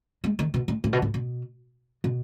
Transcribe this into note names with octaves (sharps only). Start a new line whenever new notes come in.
G#3
D#3
B2
A2
A2
B2
A2
B2
B2